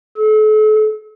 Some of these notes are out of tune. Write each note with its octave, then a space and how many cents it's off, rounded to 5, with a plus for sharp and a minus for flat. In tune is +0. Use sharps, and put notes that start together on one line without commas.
A4 -40